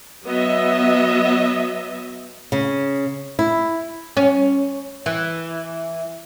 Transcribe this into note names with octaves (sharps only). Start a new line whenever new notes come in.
F#3 B3 D#5 E5
C#3
E4
C#4
E3